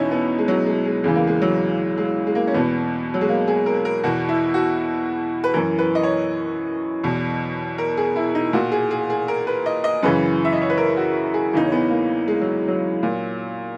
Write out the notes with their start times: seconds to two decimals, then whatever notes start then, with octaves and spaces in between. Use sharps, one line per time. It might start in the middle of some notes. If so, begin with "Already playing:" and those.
Already playing: E2 B2 C#4 D#4 E4
0.11 B3
0.39 G#3
0.48 F#3
0.67 G#3
0.85 G#3
1.04 E2 C#3 E3 G#3
1.16 A#3
1.27 G#3
1.42 F#3
1.98 G#3
2.27 G#3
2.35 A#3
2.47 C#4
2.54 E2 B2 B3
3.14 F#3
3.21 G#3
3.29 A#3
3.48 G#4
3.66 A#4
3.85 A#4
4.03 E2 B2 F#4
4.29 E4
4.54 F#4
5.44 B4
5.54 F#2 E3 A#4
5.79 B4
5.95 D#5
6.03 C#5
7.03 E2 B2
7.78 A#4
7.97 G#4
8.16 E4
8.35 D#4
8.53 A#2 F#4
8.72 G#4
8.91 G#4
9.10 G#4
9.28 A#4
9.47 B4
9.66 D#5
9.84 D#5
10.03 F#2 C#3 E3 B4
10.45 E5
10.53 D#5
10.62 C#5
10.70 B4
10.77 A#4
10.97 F#4
11.34 G#4
11.53 E2 C#3 E3 D#4
11.64 C#4
11.72 B3
11.90 A#3
12.28 G#3
12.41 F#3
12.68 F#3
13.03 A#2